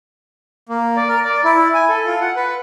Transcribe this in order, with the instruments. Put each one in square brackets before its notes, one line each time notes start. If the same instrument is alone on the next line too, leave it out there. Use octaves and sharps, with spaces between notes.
[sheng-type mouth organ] A#3
D5
A#4
D5
E4
G#5
A4
F4
F#5
B4